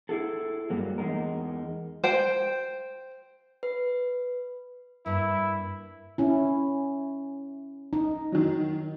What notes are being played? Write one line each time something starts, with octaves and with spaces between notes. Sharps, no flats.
E4 G#4 A4
G2 F#3 A#3
E2 A#2 G#3 D#4 A#4
C5 G5
B4
G2 A#3 E4
C#4 E4
D#4
D#3 F#3